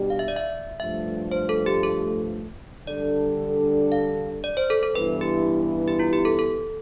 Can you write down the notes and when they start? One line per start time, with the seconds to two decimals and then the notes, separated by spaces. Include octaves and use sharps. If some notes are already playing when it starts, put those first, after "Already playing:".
Already playing: B2 G3 D4 G4
0.10 F5
0.19 E5
0.28 D5
0.36 E5
0.80 G2 F3 A3 E5
1.31 C5
1.49 A4
1.66 G4
1.83 A4
2.87 D3 G3 D4 A4 D5
3.92 F5
4.44 D5
4.57 C5
4.70 A4
4.83 A4
4.95 G2 E3 B3 E4 B4
5.21 G4
5.88 G4
5.99 F4
6.13 G4
6.25 A4
6.39 A4